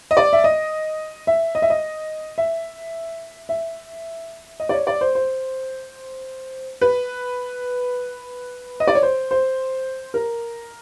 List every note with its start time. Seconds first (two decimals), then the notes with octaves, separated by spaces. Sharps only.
0.11 D#5
0.17 D5
0.33 E5
0.44 D#5
1.27 E5
1.55 D#5
1.62 E5
1.70 D#5
2.38 E5
3.49 E5
4.60 D#5
4.69 D5
4.74 C#5
4.87 D5
5.01 C5
5.15 C5
6.81 B4
8.80 D#5
8.87 D5
8.95 C#5
9.03 C5
9.31 C5
10.14 A#4